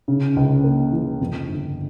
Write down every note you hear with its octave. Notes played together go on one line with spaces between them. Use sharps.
C#3
C#2
A#3
E3
F2
G1